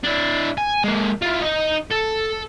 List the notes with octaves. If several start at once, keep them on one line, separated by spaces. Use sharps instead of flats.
D4 E4
G#5
G#3 A#3
E4 F4
D#4 D#5
A4